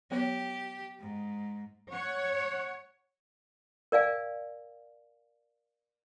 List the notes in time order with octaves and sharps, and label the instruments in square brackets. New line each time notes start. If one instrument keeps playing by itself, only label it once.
[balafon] F#3 B3 C#5 [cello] G4
[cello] G#2
[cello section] C#5 [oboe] F#5
[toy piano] A#4 D5 F5 G#5